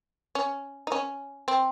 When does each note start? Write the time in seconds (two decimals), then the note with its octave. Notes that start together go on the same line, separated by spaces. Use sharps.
0.35 C#4
0.87 D#4
0.92 C#4
1.48 C4